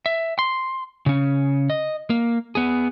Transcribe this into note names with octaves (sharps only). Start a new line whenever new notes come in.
E5
C6
C#3 C#4
D#5
A#3
B3 G#4